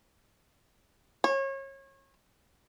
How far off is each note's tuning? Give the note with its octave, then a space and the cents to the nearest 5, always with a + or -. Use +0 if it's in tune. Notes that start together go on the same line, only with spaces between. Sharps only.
C#5 -30